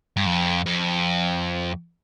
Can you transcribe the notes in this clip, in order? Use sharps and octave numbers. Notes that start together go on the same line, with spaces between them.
G2
F2
F2